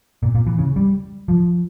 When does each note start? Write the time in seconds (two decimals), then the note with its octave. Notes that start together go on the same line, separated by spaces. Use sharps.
0.23 A#2
0.35 A#2
0.47 E3
0.58 C#3
0.76 G3
1.28 F3